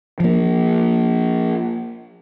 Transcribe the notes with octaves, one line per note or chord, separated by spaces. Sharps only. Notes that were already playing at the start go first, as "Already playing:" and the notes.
F3 A#3